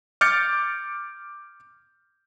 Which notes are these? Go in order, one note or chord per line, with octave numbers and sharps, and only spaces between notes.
D6 F6 G6 A6 C#7